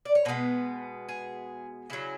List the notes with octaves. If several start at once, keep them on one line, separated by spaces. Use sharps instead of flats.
D5
C#5
B2 G#3 B3 B4
G#4
C#3 F#3 C#4 E4